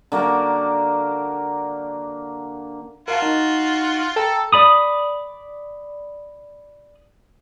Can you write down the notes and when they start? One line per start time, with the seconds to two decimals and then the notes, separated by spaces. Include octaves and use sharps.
0.12 D3 A#3 F#4 A#4
3.08 F4 F#4 A#4 F5 A5
3.22 D#4
4.16 A4 G5 A#5
4.53 D5 B5 D#6